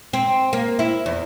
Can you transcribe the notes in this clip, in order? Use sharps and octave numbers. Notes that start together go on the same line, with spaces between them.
C4
A#3
E4
E2